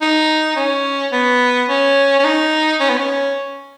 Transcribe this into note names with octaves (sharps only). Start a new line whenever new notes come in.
D#4
C#4
B3
C#4
C#4
D#4
C#4
B3
C#4